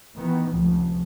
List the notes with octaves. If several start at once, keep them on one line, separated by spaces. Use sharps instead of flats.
D#3 E3 B3
F1 C#2 F3